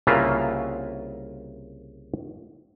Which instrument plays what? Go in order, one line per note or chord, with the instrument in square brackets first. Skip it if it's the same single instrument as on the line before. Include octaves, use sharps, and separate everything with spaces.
[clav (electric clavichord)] C2 C#3 A#3 F4 B4 E5